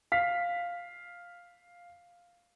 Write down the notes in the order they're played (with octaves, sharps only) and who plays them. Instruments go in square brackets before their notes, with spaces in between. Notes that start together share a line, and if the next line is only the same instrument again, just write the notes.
[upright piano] F5 B6